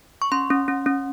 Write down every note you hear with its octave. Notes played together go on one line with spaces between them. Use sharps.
C#6
C#4 C6
C#4
C#4
C#4